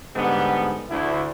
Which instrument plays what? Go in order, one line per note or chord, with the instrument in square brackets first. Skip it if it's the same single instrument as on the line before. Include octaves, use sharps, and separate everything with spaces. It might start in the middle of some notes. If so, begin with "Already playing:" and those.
[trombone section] G#2 D3 G3 B3
D2 E4